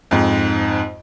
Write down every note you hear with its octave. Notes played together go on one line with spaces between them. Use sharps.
F2 G#2